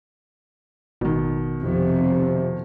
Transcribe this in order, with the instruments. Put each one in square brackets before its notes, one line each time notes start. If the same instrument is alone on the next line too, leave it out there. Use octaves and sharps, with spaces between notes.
[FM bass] A1 [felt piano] B2 D#3
[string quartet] F2 [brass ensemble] C3